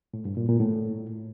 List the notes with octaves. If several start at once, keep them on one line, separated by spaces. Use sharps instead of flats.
A2
G2
A#2
A#2
A2